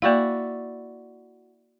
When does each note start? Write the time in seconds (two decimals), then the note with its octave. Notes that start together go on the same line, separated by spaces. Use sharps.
0.02 A#3 E4 F#4 D5 F5